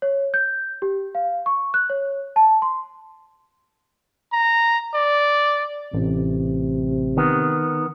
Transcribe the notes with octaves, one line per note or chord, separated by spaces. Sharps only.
C#5
G6
G4
F5
C#6
F#6
C#5
A5
C6
A#5
D5
A1 C3
D#3 B3